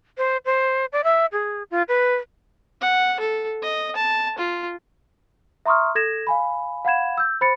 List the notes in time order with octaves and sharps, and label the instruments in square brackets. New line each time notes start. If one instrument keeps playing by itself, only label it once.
[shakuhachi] C5
C5
D5
E5
G#4
F4
B4
[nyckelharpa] F#5
A4
D#5
A5
F4
[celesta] E5 A#5 C6 C#6 D#6 F6
A4 G#6 A#6 E7
F5 G#5 B5
F5 F#5 B5 G#6 E7
E6 G6
C5 B5 A6 C#7